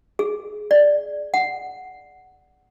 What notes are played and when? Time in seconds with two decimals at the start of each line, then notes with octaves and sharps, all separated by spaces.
0.19 G#4
0.71 D5
1.34 F#5